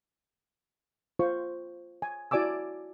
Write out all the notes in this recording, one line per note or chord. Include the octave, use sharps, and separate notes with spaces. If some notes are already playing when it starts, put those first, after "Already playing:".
F4 C5 C#6
G#5
E4 F#4 D5 G#5 D6 E6